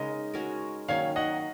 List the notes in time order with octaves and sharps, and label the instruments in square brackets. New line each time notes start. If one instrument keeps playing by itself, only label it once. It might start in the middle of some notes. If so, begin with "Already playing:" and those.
Already playing: [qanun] C#3 G#3 D#4 A#4 [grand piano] D#5
[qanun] G#3 C#4 F#4 A#4
[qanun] D#3 F#3 A#3 C#4 [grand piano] C#5 F5
[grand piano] D#5 F#5